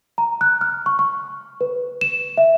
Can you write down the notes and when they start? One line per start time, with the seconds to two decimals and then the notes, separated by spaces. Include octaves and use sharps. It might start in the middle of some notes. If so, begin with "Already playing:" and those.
0.18 A#5
0.41 F#6
0.61 F6
0.86 C#6
0.99 C#6
1.61 B4
2.01 E7
2.37 E5